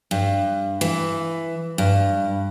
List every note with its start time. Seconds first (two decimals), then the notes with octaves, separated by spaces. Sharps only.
0.11 G2
0.81 E3
1.78 G2